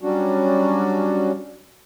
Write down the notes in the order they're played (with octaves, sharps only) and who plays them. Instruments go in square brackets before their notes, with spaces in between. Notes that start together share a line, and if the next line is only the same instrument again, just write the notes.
[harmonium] F#3 G3 C#4 D4 F#4